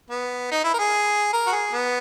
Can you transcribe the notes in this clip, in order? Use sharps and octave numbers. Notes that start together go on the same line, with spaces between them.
B3
D#4
E4
A#4
G#4
A#4
F#4
G#4
B3